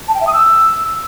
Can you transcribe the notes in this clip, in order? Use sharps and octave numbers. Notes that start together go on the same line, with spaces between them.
A5
G5
E5
D#6
E6